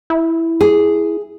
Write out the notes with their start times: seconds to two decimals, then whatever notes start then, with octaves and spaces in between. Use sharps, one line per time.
0.10 E4
0.61 G#4